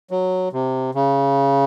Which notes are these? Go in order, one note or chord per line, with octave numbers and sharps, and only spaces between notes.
F#3
C3
C#3